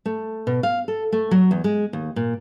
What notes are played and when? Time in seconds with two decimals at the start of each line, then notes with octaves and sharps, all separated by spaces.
0.06 A3
0.47 B2
0.63 F5
0.88 A4
1.12 A3
1.31 F#3
1.51 E2
1.64 G#3
1.93 D#2
2.16 A#2